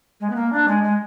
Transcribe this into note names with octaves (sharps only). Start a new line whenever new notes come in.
G#3
B3
A#3
D4
G#3
G#3